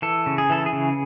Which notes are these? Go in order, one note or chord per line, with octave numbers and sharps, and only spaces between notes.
E3 A4
C#3
G#4
E3 A4
G#4
C#3